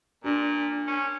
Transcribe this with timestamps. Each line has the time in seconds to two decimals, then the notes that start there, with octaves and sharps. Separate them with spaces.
0.24 A#2 D4
0.88 C#4